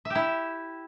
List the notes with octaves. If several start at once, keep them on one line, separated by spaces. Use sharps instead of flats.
E5
G4
E4